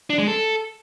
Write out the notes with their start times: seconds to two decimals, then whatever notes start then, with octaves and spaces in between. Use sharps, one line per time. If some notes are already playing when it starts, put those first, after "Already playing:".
0.10 D4
0.19 G#3
0.28 A4